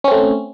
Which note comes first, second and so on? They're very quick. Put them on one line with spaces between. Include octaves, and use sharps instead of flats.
C#4 C4 A3